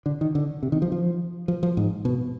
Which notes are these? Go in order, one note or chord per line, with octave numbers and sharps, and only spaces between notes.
D3
D#3
D3
C3
D#3
F3
F3
F3
F3
G#2
B2